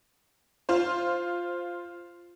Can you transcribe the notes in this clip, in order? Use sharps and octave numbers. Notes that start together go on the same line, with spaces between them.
F4 C5